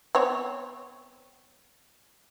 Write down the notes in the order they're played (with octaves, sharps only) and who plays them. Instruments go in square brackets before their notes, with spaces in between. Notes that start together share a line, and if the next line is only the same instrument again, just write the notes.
[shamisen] B3 C4 C#5